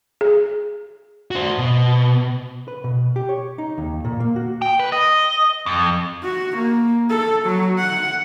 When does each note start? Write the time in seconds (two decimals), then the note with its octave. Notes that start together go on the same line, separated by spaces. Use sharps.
0.21 G#4
1.31 F#4 C5
1.58 B2
2.68 B4
2.84 B2
3.16 G4
3.29 C#5
3.58 D#4
3.78 D#2
4.05 A#2
4.20 A#3
4.36 F#4
4.62 G5
4.79 B4
4.92 D#5
5.66 F2
6.23 F#4
6.57 A#3
7.10 A4
7.46 F#3
7.78 F#5